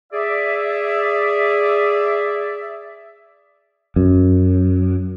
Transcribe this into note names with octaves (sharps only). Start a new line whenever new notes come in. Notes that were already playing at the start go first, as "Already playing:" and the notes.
G#4 D5 E5
F#2